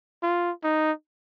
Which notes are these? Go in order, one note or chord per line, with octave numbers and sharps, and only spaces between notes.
F4
D#4